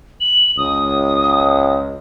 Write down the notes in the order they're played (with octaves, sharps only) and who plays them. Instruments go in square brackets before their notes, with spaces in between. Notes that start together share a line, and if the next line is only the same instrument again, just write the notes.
[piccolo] F#7
[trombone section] C#2 [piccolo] D#6